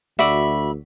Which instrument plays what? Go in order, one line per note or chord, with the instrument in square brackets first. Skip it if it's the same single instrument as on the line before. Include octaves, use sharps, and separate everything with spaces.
[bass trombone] D2 [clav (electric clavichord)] F#4 D5 [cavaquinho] E5 [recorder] B5